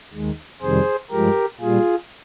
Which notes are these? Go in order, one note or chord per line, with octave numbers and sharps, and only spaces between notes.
D#2 D#3 G#3
F2 C3 D#3 G3 G#4 C5
G2 F3 G#3 G4 A#4
A#2 G3 F4 G#4